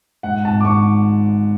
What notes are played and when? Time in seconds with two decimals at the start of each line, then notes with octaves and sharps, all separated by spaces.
0.23 G#2 F#5
0.45 G#1 A5
0.61 D6
0.64 G#2 C#6